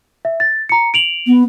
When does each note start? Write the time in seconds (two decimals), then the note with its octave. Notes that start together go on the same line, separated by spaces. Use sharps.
0.25 E5
0.40 A6
0.69 A#5 C#7
0.94 D7 F7 F#7
1.27 B3